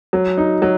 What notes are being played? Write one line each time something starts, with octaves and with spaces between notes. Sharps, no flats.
F#3
D#4
F#3